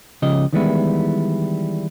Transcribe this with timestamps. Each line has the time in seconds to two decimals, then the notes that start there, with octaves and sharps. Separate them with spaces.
0.22 C#2 C#3 F3 G4 D#5
0.53 D#3 E3 G3 G#3 B3 E4